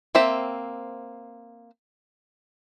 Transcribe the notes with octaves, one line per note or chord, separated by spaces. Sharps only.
A#3 C4 C5 E5